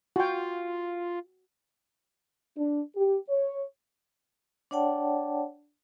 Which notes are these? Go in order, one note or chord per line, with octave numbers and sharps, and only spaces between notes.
F4 F#4 G5
D4
G4
C#5
D4 C#5 D5 F#5 G5 A5